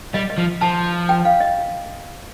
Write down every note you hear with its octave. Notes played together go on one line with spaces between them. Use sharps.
G3 D#5
D#5
F3
F3 A5
G5
F5
D#5